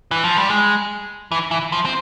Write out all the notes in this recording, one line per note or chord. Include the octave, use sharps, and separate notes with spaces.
E3
F3
G3
G#3
E3
E3
F3
C4